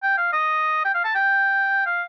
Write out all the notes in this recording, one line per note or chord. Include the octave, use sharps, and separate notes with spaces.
G5
F5
D#5
G5
F5
A5
G5
F5